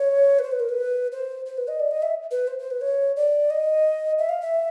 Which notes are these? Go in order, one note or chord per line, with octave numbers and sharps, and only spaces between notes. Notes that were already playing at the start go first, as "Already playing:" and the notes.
Already playing: C#5
B4
C5
B4
A#4
B4
C5
C5
B4
D#5
D5
D#5
E5
B4
C5
C5
B4
C#5
D5
D#5
E5
F5
E5